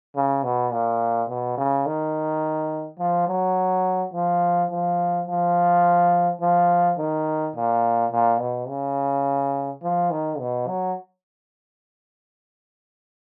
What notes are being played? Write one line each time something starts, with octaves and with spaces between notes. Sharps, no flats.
C#3
B2
A#2
B2
C#3
D#3
F3
F#3
F3
F3
F3
F3
D#3
A#2
A#2
B2
C#3
F3
D#3
B2
F#3